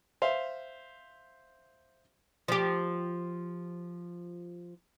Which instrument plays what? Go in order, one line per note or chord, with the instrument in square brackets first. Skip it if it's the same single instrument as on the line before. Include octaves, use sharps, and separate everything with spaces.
[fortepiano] C5 E5 F5
[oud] F3 G4